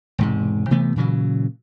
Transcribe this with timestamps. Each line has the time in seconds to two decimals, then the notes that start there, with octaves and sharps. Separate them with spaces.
0.18 E1 G#2 C3
0.70 C3 E3 A3 B3
0.96 A#2 C#3 E3 F#3